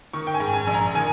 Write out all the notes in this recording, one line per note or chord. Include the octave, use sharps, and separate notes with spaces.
D#3 C#6
G5
G#5
G#2
G#5
A#1
A#5
D#3 G#5